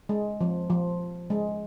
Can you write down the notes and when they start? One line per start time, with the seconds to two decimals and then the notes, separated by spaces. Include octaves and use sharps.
0.09 G#3
0.41 F3
0.70 F3
1.30 G#3